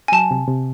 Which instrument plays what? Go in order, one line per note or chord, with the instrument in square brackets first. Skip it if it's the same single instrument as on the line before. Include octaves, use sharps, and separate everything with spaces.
[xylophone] G#5
[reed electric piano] F#3 [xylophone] A5
[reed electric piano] C3
C3